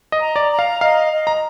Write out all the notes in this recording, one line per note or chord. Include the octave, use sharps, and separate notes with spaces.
D#5
A#5
D5
A#5
F5
D#5 F5
D#5
A#5